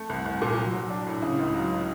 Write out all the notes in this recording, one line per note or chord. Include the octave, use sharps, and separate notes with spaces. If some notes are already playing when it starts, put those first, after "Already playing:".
Already playing: A3
C2
C2
A#2
F#3
F#3
D4
A2
C#3
C#2
F#3